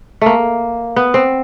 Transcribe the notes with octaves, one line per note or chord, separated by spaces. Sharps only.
A3 A#3
B3
C4